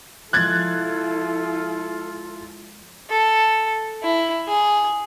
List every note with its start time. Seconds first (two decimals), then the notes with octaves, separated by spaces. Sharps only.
0.33 F3 G#3 E4 F4 A4 F#6 G#6 A6
3.09 A4
4.03 E4
4.48 G#4